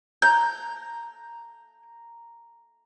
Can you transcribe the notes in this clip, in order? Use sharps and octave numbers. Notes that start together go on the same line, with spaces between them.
A#5 G6